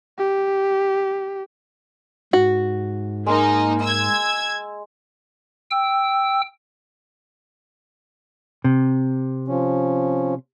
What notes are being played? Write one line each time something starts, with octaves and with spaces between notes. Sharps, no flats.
G4
G#2 F#4
G#3 A#3 D#4
E6 G#6
G5 E6
C3
F3 C#4